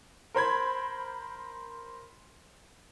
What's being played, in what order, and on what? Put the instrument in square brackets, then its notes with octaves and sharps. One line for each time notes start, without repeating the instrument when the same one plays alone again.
[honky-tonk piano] A#4 C5 B5 G#6